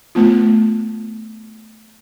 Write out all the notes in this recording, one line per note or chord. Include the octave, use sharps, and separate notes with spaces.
A3 B3 F4